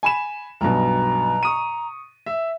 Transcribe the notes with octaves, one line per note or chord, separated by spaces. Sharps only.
G#5 B5 E7
B1 G2 B2 A#5
C#6 D#6 D#7
E5